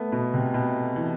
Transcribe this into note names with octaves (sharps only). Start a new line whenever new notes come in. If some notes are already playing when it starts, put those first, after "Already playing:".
Already playing: A3 B3
B2
C3
B2
E3